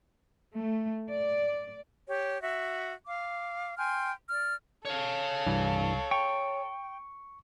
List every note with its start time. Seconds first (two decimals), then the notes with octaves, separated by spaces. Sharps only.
0.54 A3
1.10 D5
2.08 G4 C#5
2.41 F#4 E5
3.05 F5 D6
3.77 G5 G#5 C6 F6
4.30 D5 F6
4.85 A4 C#5 F5
5.46 C2 G2 E3
6.11 G5 C#6